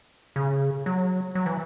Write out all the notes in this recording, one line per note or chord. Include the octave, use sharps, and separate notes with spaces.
C#3
F#3
F#3
E3